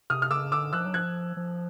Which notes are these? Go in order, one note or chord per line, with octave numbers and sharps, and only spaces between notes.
C3 D#6 F6
F6
C#3 D6 E6
D3 D6 E6
F3 E6 F#6
F#3
F3 F#6 G#6
F3